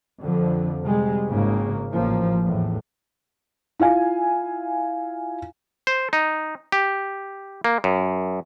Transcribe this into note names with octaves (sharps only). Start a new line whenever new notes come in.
F2 D3 F3
C3 G3 G#3
G#1 G#2 C#3 A#3
A1 F3 A#3
E2 A2
E4 F4 F5 G#5
C5
D#4
G4
A#3
F#2